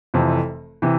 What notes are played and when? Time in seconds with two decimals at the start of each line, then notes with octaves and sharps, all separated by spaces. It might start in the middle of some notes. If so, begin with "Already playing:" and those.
0.14 F1 F2 C3 E3
0.82 C3 E3